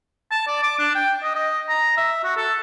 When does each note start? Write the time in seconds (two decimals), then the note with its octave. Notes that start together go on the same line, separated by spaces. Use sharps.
0.31 A5
0.48 D5
0.63 D6
0.79 D4
0.95 G5
1.23 D#5
1.35 D#5
1.69 A#5
1.97 E5
2.24 F#4
2.37 A4